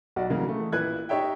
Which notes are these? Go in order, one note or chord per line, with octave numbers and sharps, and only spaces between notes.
B1 F#4 D5 F#5
C#3 E3 F#3 A#3
E3 A3 G#4
A1 A#2 E4 B4 F#6 G#6
D#4 G4 C#5 E5 G5